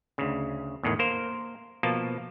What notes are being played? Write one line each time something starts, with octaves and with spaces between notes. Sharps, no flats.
D2 C#3
E2 A2 D#3
A#3 A#4 C5
B2 F3 A#3 A5